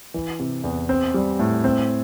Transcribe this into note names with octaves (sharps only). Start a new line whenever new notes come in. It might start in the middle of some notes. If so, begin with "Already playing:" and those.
E3
C3
E2
C4
G3
A2
C4